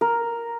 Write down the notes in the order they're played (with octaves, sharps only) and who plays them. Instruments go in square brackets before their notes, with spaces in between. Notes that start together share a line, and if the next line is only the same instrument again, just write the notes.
[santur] A#4